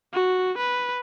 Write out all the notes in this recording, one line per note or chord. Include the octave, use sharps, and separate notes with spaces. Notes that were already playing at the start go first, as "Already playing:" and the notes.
F#4
B4